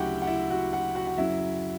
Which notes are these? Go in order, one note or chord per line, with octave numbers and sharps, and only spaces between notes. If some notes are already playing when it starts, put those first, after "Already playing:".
Already playing: D2 C#3 F#3 E4 F#4 G4 F#5 G5
F#5
E4 E5
F#4 F#5
F#4 F#5
F#4 F#5
F#5
F#2 C#3 F#3 E4 E5